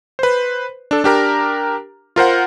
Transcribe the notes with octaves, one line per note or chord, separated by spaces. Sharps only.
B4 C5
D4 A4
D4 G4 A#4 A#5
F4 A#4 C5 F#5